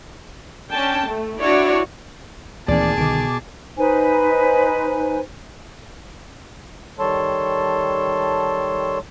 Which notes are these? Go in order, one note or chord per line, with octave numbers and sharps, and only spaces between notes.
C#4 D4 G5 A5
A3
D4 E4 F#4 C#5 D5
D2 A#2 D#3 E3 C4 G#4 D5 A5
C2 B2 D3 D#3 D6
D#4 B4 C5 G#5
D#3 G3 A4 C#5 A5 C6